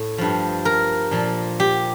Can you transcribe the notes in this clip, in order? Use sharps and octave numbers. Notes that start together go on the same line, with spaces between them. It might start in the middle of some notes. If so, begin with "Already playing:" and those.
Already playing: A2
G2 F3
A#4
A#2 F3
G4